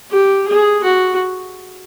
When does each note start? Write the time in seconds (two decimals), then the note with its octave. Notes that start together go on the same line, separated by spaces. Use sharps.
0.11 G4
0.48 G#4
0.84 F#4